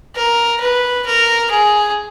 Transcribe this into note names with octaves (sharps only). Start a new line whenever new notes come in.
A#4
B4
A#4
G#4